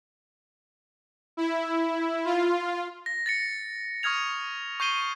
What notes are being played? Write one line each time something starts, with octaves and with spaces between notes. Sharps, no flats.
E4
F4
A#6
A6 A#6 C#7
C#6 D#6 F6 G#6 F7
C#6 G6 C7 D#7 G7